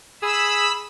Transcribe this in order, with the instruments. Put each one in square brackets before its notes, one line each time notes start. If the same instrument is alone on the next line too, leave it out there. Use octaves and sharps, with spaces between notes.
[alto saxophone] G#4 [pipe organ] B5 E6